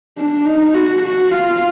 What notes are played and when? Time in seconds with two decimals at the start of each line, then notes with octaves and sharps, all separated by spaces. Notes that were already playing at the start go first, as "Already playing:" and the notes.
0.18 D4
0.46 D#4
0.74 F#4
1.02 F#4
1.31 F4